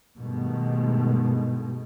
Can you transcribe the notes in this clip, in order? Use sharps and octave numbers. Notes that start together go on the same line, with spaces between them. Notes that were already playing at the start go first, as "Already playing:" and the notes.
G2 B2 D#3 G#3 A3